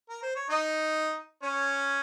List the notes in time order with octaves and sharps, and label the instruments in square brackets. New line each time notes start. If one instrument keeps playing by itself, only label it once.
[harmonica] A#4
C5
C#5
D#4 D#5
C#4 C#5